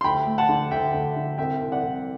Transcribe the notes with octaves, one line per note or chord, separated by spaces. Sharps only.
C6
D2 G5 B5
A3
F#5 A5
D3
D2 E5 G5
D2
D3
C2 E5 G5
C2
D5 F#5
C2